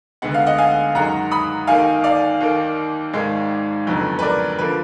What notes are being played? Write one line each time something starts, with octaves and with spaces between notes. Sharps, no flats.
D2 D3 G#3 B3 F#5
F5
D#5 F#5
F5 G#5
F#2 D#3 G#3 F#5 A#5
B5 D#6
D#2 D#3 A#3 F5 G#5
D5 F5
D#2 D#3 A#3
G#1 G#2 D#3 G#3
F#1 F2 D3 F#3 B3
B4
A#4 D5
D3 F3 A#3 B4